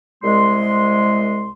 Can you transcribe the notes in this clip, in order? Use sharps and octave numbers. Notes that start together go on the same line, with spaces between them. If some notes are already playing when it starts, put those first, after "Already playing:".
C2 G#3 C6